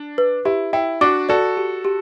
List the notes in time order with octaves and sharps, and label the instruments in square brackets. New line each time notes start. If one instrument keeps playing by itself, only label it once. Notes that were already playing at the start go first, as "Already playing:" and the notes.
Already playing: [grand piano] D4
[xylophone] B4
[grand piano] E4 [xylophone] G4
[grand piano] E4 [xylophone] G5
[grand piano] D4 F#4 [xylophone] D6
[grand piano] F#4 A4 [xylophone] D5
[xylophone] G4
G4